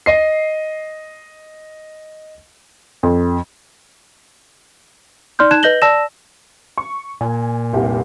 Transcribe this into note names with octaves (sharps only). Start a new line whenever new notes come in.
D#5 C7
F2
D#4 D5 C6 F6 G6
D#4 A5 F#6 G#6 E7
B4 D#5 G6 A#6 F#7 G7
D5 A5 E6 A#6 E7
C#6
A#2 G#5
F1 C2 G4